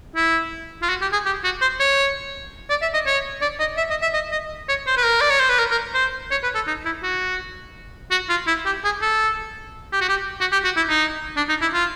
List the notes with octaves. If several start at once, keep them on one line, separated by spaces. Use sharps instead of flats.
E4
F4
F#4
G4
G#4
G4
F#4
C5
C#5
D5
E5
D#5
C#5
D5
D#5
E5
D#5
E5
D#5
D#5
C#5
C5
B4
A#4
D5
C#5
C5
B4
A#4
A#4
C5
C#5
B4
A4
D#4
E4
F#4
F#4
F4
E4
G4
G#4
A4
G4
F#4
G4
F#4
G4
F#4
E4
D#4
D4
D#4
E4
F4